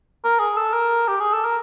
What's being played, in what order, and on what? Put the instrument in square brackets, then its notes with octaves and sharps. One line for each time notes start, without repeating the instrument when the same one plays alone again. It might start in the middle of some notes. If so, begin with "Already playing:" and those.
[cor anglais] A#4
G#4
A4
A#4
G4
G#4
A4
A#4